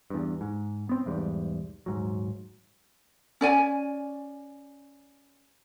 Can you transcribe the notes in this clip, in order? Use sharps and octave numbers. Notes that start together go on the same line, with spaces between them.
E2 G2
G#2
B3 C4
B1 E2 G#2 G3
D#1 G#2 F#3
C#4 D5 G#5